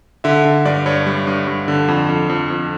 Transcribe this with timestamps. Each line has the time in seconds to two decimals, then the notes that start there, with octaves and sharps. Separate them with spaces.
0.24 D3 E5
0.45 D3
0.65 G2 D5
0.86 G2 C#5
1.06 G3
1.27 G2
1.47 G2
1.68 D3
1.88 F2
2.09 F2
2.29 F2
2.50 F2